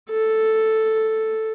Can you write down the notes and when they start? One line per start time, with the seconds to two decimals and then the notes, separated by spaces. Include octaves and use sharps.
0.10 A4